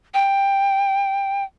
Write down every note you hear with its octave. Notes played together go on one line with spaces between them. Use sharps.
G5